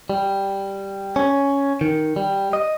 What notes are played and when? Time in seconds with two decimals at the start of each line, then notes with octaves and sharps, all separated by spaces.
0.10 G3
1.16 C#4
1.81 D#3
2.16 G3
2.53 D#5